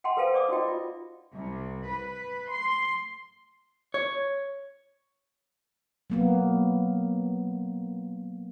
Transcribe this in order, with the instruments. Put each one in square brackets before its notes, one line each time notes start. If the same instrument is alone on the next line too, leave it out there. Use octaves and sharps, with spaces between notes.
[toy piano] F#5 G5 A5 C6
A4 B4 C5 F5 G5 A5
D5 D6 D#6
D#4 F4 F#4 D#5 G5
F4
[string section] C2
B4
C6
[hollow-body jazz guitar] C#5
[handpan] F#3 A#3 B3